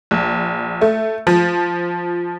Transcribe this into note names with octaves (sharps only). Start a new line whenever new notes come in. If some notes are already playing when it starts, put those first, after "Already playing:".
A#1
A3
F3